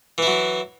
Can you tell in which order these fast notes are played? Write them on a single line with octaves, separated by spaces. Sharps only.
E3 E4 F#3